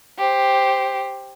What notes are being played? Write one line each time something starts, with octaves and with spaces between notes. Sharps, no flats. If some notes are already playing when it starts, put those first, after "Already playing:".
G4 C5